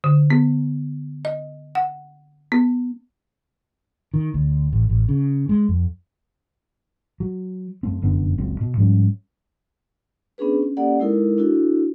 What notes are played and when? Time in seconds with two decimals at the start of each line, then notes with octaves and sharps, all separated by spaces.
0.04 D3
0.30 B3
1.25 D#5
1.75 F#5
2.52 B3
4.14 D#3
4.34 D2
4.73 A1
4.89 A1
5.09 C#3
5.49 G#3
5.69 F2
7.20 F#3
7.83 F#2 A3 C4
8.02 F1 F#2 D3 B3
8.38 F#1 C#2 F#3 C4
8.61 B2
8.77 G#2 F3 G3 C#4
10.38 B3 C#4 D4 G#4 B4
10.62 C#4
10.77 A#3 C#4 G4 A4 D5 F#5
11.00 G#3 D#4 E4 A4 A#4
11.37 D4 E4 F#4 A4